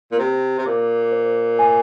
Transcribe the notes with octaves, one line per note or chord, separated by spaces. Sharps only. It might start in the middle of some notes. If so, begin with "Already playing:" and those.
A#2
C3 C5
C3
A#2 D6
C5
G#5